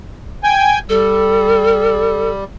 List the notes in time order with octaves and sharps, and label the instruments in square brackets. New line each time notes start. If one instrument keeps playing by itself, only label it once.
[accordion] G5 G#5
[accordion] G3 [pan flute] A4